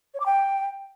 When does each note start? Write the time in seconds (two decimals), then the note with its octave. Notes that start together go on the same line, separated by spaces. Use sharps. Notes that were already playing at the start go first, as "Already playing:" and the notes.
0.14 C#5
0.20 D6
0.26 G5